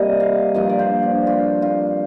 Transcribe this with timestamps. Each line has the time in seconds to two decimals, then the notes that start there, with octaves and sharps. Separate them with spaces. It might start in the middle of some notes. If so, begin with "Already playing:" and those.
Already playing: C3 G3 A#3 D#5
0.20 F5
0.54 G2 F3 A#3 D#5
0.69 D5
0.79 C5
1.02 D4
1.27 F4
1.62 F4